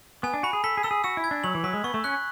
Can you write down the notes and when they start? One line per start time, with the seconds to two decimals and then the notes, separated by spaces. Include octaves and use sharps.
0.23 B3 G#5
0.34 D4
0.43 F#4 B5
0.53 G#4
0.64 A4 B6
0.77 G#4
0.83 A4 E6
0.91 G#4
1.04 F#4 E6
1.17 E4
1.24 G#6
1.31 D4
1.44 F#3 F#7
1.55 E3
1.64 F#3 B6
1.73 G#3
1.84 B3 C#6
1.94 A3
2.04 C#4 F#6